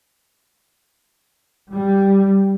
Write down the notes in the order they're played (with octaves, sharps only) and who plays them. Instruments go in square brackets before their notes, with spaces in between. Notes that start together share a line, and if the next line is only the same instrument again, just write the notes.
[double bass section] G3